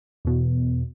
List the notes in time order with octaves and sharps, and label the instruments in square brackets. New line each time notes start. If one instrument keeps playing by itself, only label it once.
[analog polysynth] E2 B2